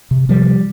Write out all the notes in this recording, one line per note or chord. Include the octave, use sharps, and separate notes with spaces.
C3
C3 F3 G3